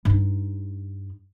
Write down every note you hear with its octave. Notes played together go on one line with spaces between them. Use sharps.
G2 D#4